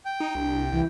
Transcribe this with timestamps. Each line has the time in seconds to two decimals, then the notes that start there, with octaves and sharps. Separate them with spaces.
0.05 G5
0.20 D#4
0.35 C2 D4
0.72 C2 E3